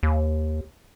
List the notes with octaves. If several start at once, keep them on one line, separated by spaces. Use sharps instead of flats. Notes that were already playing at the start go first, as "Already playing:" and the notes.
D#2